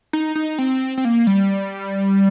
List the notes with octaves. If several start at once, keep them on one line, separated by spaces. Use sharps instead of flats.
D#4
D#4
C4
C4
A#3
G3